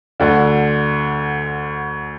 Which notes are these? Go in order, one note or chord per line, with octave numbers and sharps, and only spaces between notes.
D2 D3